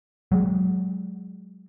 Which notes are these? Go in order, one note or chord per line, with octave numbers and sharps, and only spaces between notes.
F#3 G#3